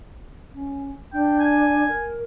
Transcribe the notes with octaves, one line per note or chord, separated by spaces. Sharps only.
C#4
D4 G5
G#5
A#4